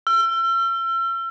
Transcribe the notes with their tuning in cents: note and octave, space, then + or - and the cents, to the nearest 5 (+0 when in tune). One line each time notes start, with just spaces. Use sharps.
E6 +40